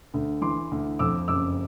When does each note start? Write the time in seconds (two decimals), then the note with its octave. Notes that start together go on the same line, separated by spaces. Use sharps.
0.14 D2
0.41 E3 C6 D6
0.71 D2
0.99 F2 D6 E6
1.28 F#1 D6 E6